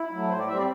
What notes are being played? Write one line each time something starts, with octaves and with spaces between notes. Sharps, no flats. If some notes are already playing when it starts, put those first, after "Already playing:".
Already playing: E4
F#3 A3
A2 C5
D5
G3 C4 E5
D5